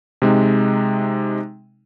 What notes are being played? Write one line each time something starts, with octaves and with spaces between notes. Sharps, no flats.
C3 G#3 D#4